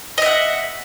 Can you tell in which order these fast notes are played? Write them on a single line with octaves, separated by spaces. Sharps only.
D#5 E5 F#5